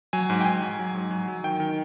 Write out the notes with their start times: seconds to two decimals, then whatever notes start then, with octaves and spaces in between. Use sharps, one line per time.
0.13 F#3 G#5
0.30 G#2
0.41 G5
0.45 G#2 G#5
0.62 F#3
0.79 F#3
0.94 G#2
1.11 F#3
1.28 F#3
1.44 D#3 G5
1.60 D#3